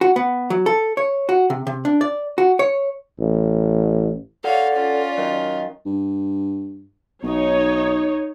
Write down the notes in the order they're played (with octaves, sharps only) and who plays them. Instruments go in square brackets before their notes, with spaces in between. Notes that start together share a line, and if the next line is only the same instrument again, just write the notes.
[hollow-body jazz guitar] F#4
B3
F#3
A4
C#5
F#4
C3
C3
D4
D5
F#4
C#5
[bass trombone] A1
[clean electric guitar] A4 F#5 [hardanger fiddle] C#5 F5 [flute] D5
[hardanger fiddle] C#4 F4
[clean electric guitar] F#2 [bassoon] D#3
[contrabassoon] G2
[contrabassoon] B1 [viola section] D#4 C#5